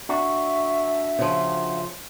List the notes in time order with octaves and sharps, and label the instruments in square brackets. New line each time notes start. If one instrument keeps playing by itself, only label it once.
[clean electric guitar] D4 F#4 [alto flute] E5
[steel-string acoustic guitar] C#3 F3